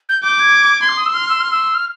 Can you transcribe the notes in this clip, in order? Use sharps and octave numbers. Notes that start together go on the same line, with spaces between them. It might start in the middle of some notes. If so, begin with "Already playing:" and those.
G6
D6 G6
G#6
C6
D6
D#6
E6
C6 F6
E6
F6
E6
F6